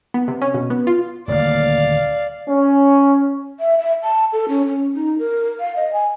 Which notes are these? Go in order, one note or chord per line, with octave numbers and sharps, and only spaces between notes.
B3
C3
C#4
B2
B3
F4
D#1 D2 A#3 D5 F5
C#4
E5
E5
A5
A4
C#4
C#4
D#4
A#4
F5
D#5
G#5